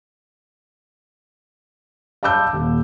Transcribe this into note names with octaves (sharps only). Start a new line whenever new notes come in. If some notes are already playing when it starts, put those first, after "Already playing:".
F5 A5 B5 D6 E6 G6
D#1